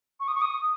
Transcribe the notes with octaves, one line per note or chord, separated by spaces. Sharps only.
C#6
D#6
C#6
D#6